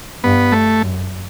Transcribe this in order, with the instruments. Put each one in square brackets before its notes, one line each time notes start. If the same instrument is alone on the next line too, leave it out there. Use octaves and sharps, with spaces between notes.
[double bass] G2 [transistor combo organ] B3
[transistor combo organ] A3
[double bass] F#2